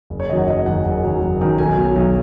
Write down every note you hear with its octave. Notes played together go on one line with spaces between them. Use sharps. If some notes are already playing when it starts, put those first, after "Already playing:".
F#1
C#5
F#2 D#3 F#3 D#5
F#5
F#1 D#5
F#2 D#3 F#3 F#5
F#1
F#2 D#3 F#3
F#1
F#2 D#3 F#3
B1 G#5
B2 F#3
B1